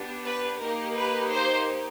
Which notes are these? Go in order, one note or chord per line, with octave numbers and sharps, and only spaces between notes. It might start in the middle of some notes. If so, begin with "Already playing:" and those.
Already playing: B3 D4 G4
B4
A#3 D#4 G4 A#4
B4
C5